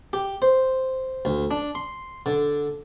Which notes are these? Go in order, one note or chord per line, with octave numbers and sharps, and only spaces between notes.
G4
C5
D2
D4
C6
D3